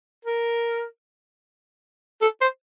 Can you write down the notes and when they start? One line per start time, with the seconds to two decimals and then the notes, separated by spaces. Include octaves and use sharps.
0.25 A#4
2.21 A4
2.41 C5